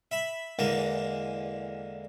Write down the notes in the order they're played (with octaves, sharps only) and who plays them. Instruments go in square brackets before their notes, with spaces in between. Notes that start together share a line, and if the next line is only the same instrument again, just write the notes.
[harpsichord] E5 B5
E2 D3 G#3 A#3